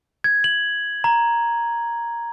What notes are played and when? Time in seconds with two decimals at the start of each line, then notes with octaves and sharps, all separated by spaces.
0.24 G#6
0.44 F#7
1.04 A#5